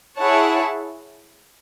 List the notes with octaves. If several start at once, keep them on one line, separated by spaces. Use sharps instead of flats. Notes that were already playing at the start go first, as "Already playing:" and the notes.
E4 G#4 C#5 F#5 A5